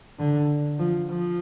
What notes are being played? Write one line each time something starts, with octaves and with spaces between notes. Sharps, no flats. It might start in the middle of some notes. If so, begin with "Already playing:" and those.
D3
F3
F3